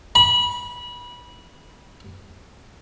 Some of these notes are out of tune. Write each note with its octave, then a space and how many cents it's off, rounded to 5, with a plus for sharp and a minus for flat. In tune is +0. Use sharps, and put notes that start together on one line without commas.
B5 -25